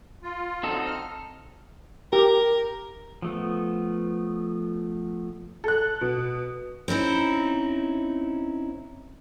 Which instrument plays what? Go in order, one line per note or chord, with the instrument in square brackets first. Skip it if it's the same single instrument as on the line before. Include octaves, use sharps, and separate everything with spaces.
[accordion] F4
[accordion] D3 F3 F#3 [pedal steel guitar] C4 D#4 A4
[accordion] F6
[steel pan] G4 [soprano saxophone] A#4
[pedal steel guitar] F3 A3 B3
[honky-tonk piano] A4 F#6
B2
[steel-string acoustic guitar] C4 C#4 D#4 E4